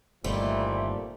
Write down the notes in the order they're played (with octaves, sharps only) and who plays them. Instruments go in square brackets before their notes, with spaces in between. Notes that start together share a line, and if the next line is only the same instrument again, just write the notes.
[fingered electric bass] G1 [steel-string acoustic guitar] D#2 G3 A3 [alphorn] A#2 [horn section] E3 C4 E4